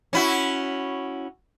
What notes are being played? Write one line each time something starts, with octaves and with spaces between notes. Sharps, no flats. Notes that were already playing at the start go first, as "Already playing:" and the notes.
C#4 E4 F#4